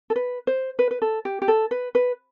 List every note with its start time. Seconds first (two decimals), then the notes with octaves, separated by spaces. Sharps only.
0.10 A4
0.16 B4
0.47 C5
0.79 B4
0.91 B4
1.02 A4
1.25 G4
1.42 G4
1.48 A4
1.71 B4
1.95 B4